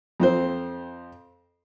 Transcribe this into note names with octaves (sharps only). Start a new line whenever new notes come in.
F2 C4 C5